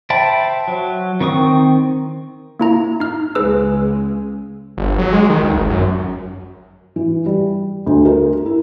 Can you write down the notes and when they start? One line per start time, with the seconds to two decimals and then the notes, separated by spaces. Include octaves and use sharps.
0.10 C5 E5 G5 A5 B5
0.68 F#3
1.20 D#3 C4 C#6 D#6
2.59 A#3 E4 A#5
3.00 D#4 F6
3.35 C#2 C#3 G#3 G#4 B4 E6
4.78 G1
4.99 F#3
5.13 G#3
5.29 D#3
5.42 D2
5.56 G#1
5.70 F#2
6.96 E3
7.26 G3
7.86 D2
8.05 A#4
8.46 E4